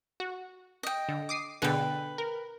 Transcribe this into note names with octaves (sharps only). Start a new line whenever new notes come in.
F#4
D#5 G5
D3
D6 D#6 C7
B2 D3 G#4 B4 G5
A#4